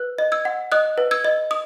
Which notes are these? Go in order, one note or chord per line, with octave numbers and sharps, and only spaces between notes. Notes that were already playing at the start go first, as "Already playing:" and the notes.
Already playing: B4 F#6
D#5
E6 G#6
F#5
D#5 D#6 F#6
B4
E6 G#6
D#5
D#6